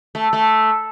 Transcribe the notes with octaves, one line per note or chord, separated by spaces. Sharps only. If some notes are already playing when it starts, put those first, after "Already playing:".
A3
A3